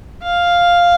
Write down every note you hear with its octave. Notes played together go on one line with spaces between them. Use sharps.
F5